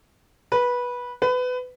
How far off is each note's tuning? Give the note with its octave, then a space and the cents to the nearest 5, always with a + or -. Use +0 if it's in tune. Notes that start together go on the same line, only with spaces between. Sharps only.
B4 -15
B4 +25